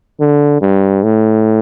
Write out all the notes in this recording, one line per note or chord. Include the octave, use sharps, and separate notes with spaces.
D3
G2
A2